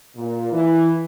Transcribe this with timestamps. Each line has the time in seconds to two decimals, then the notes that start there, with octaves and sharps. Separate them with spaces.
0.16 A#2
0.52 E3